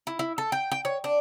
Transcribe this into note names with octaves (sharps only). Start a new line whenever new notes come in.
E4
E4
A4
G5
G5
C#5
D4